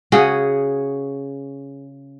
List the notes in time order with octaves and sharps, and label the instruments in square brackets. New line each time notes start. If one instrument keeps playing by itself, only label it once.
[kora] C#3 C#4 F#4 G#4